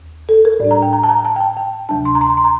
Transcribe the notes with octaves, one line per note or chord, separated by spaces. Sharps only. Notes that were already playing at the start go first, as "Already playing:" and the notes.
Already playing: D#2
A4
A#4
A2 G3 D4 D5
A#5
G5
A#5
A5
A#5
A5
G5
A5
G5
D2 C3 F#3 A3 D4 A5
C6
A#5
C6
A#5
C6
A#5